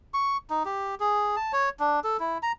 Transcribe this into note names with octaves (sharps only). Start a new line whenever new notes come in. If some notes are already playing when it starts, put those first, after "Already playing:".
C#6
D#4
G4
G#4
A5
C#5
D4
A4
E4
A#5